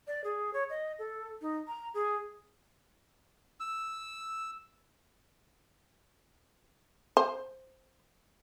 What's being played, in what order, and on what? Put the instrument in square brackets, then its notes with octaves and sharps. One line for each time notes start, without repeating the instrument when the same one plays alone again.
[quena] D5
G#4
C#5
D#5
A4
D#4
A#5
G#4
[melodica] E6
[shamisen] C5